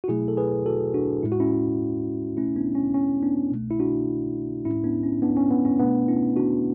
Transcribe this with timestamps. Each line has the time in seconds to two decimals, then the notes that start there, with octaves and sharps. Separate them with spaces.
0.04 F#4
0.08 B2 F#3 A3 E4 G#4
0.28 A4
0.37 G#4 B4
0.66 F#4 A4
0.94 D4 F#4
1.23 A2 G#3 E4
1.32 F#4
1.40 C#4 E4
2.37 B2 A3 C#4 E4
2.56 B3 D4
2.75 C#4
2.94 C#4
3.23 B3 D4
3.51 B2 A3
3.71 E4
3.80 D4 F#4
4.65 A2 G#3 C#4 E4
4.84 B3 D4
5.03 C#4
5.22 B3 D4
5.37 C#4
5.51 B3
5.65 C#4
5.79 B2 A3 B3 D4
6.08 C#4 E4
6.36 D4 F#4